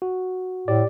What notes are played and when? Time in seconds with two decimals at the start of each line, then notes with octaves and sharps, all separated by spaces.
0.02 F#4
0.68 A2 G4 D5